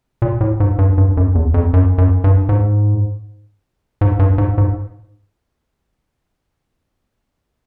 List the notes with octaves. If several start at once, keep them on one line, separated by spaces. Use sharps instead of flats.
A#2
A2
G#2
G2
G2
F#2
E2
F2
F#2
F#2
G2
G#2
G#2
G2
G#2
G#2